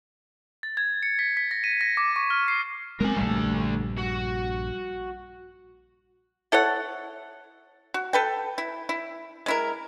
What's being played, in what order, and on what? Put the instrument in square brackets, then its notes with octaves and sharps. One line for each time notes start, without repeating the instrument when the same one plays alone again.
[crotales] A6
G#6
C#7
B6
B6
A#6
D#7
A#6
D6
C#6
F6
C7
[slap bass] G#3 A3 C4 [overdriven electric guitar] A#4 G#5
[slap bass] A#1 G2 G3 [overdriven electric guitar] D3 A3
[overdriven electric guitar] F#4
[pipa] E4 A4 C#5 F#5
F#4
A4 B4 G5
E4
E4
G#3 E4 A#4